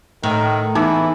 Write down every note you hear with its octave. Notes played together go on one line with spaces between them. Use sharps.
A2 D#3
E2 E3 D#4 G#5 D6